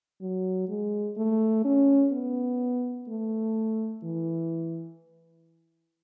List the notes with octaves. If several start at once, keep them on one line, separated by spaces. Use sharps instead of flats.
F#3
G#3
A3
C#4
B3
A3
E3